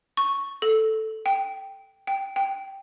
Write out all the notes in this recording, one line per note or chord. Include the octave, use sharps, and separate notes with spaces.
C#6
A4
G5
G5
G5